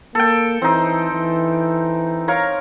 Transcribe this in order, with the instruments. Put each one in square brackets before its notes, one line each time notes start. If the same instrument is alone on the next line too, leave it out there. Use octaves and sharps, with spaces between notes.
[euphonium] A#3 [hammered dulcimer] A4 G5
[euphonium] E3 [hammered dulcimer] C4 D#4
[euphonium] E3
[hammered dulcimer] A#4 C#5 F5